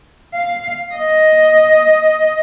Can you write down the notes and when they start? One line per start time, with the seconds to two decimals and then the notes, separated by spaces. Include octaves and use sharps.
0.34 F5
0.94 D#5